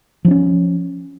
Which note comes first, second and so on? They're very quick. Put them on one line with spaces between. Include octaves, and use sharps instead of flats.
F3 D4 C#4